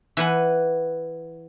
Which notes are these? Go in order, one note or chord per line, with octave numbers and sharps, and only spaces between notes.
E3 B4 F#5